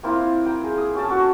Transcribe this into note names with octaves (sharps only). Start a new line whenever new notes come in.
A#3 C4 E4 F4
G5 A#5
G#4
D#6
C#4 G4 A4 A5
C#4 F#4